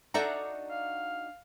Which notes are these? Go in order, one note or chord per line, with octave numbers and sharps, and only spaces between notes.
D4 D#4 F#4 A4 D5 E5 F#5 A#5
F5